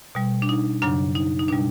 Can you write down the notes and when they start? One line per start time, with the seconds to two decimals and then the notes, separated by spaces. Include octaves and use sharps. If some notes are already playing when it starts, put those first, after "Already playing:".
0.15 B2 G3
0.42 D4
0.49 D#4
0.82 F#2 C#3 F#3 D4
1.15 D#4
1.39 D#4
1.48 B2 G3 D4